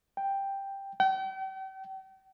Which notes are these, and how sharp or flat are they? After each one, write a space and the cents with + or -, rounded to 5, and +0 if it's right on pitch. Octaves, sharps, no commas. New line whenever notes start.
G5 +5
G5 -40